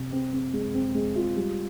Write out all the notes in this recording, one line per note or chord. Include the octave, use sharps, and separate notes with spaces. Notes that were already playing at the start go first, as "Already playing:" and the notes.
Already playing: C3
C4
C4
G#3
C4
G#3
F4
G3